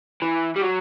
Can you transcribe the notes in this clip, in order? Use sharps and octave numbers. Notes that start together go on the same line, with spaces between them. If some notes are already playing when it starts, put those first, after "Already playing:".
E3
G3
F#3